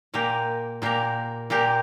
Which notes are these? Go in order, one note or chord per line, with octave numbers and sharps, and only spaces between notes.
A#2 A#3 G4 A#4
A#2 A#3 G4 A#4
A#2 A#3 G4 A#4